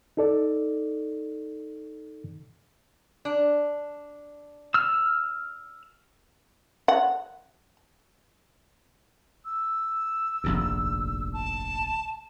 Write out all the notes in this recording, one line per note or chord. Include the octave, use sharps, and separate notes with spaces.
D#4 A4 D5
D4
E6 F6
F#5
E6
F1 A#1 D#2
A5